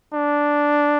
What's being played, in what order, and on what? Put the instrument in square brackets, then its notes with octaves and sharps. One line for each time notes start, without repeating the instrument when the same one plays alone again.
[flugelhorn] D4